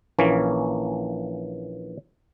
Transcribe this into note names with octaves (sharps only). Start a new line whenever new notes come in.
A#1 E3 A#3 C#4